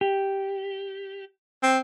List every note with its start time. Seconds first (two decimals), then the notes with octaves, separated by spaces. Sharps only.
0.01 G4
1.62 C4